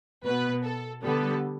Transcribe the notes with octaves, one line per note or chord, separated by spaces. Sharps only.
B2 B3 B4
A4
D3 G3 B3 A4